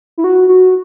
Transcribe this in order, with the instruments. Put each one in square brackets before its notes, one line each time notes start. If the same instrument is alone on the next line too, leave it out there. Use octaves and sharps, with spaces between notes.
[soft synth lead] E4
F#4
F#4